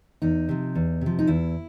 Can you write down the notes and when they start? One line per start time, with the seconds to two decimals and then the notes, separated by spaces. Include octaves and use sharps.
0.22 E2 D#4
0.49 C3 F3
0.75 E2
1.01 C3 F3
1.19 D#4
1.27 E2 E4